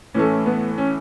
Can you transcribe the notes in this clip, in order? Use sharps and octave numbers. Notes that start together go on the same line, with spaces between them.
A2 E3 A3 C#4
B3
C#4